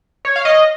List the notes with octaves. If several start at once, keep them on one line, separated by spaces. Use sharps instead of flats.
C#5
F5
D#5